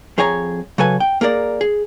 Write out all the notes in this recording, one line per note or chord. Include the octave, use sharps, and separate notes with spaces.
F2 G#4 C#5 G#5 A#5
C#3 F#3 A4 B4 G#5
G5
A#3 G#4 A#4 D5
G#4